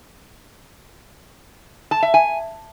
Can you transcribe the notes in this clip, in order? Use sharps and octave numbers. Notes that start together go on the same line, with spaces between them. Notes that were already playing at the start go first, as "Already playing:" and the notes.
A5
E5
G#5